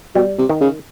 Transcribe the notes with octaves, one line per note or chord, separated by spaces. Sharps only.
B2 G3
C3
D#3
C#3